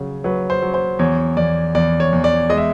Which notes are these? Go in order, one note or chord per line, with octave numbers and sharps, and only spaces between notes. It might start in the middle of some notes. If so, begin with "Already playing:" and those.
Already playing: C#3 F#3
F#3 B4
C5
F#3
C5
E2 C#5
E2 D5
E2 D5
C#5
E2
D5
G#3 D#5
E5